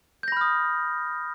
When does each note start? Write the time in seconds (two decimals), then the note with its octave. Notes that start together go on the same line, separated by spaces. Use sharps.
0.23 G6
0.28 A#6
0.32 B5
0.37 F6
0.41 D#6